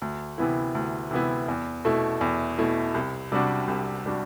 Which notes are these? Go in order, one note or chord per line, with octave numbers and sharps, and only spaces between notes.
D2
C3 E3 B3 E4
D2
C3 E3 B3 E4
E2
B2 A3 E4
E2
B2 A3 E4
C2
C3 G3 D4 F#4
C2
C3 G3 D4 F#4